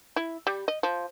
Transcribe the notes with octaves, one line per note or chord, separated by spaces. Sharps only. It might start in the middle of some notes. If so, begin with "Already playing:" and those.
E4
G3
D#5
F3